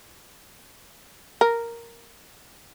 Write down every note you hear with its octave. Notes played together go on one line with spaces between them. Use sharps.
A#4